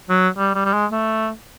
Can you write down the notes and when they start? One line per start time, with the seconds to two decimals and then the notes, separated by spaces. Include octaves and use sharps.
0.09 F#3
0.38 G3
0.55 G3
0.65 G3
0.73 G#3
0.92 A3